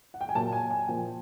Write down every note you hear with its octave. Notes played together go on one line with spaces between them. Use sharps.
F#5
G5
G#5
A#2 F#3 A5
G#5
G#5
A#2 F3 G5